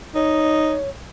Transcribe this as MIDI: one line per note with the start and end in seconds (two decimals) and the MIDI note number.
0.15 0.77 63
0.15 0.89 73